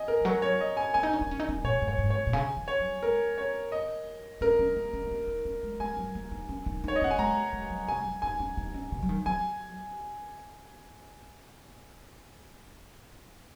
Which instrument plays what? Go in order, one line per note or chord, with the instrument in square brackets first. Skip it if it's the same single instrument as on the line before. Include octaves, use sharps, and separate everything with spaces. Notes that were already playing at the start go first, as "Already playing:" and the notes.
Already playing: [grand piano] D#5 G#5
A#4
[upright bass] D#3
[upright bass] F#3 [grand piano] A#4
[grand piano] C#5
D#5
G#5
[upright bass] C#4 [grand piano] G#5
[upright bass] D#4
C#4
D#4
C#4
D#4
C#4
[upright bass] A#2 [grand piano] C#5
[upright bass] G#2
[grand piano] C#5
[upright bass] G#2
[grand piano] C#5
[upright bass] G#2
A#2
[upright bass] C#3 [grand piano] G#5
[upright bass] D#3
[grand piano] C#5
[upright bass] F#3
[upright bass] G#3 [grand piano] A#4
[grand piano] C#5
D#5
[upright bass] C#4 [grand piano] A#4
[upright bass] C#4
A#3
C#4
A#3
C#4
D#4
C#4
G#3
[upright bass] G#3 [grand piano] G#5
[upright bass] F#3
A#3
D#4
C#4
D#4
D#4
[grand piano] C#5
D#5
[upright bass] C#4 [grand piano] F#5
[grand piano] G#5
[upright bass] G#3 [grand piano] A#5
[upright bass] G#3
F#3
[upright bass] C#3 [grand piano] G#5
[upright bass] G#3
F#3
[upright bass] D#4 [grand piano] G#5
[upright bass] C#4
D#4
C#4
C#3
F#3
D#3
[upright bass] F#3 [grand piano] G#5